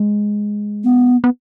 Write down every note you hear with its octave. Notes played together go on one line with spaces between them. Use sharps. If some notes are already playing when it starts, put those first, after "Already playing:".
Already playing: G#3
B3
B3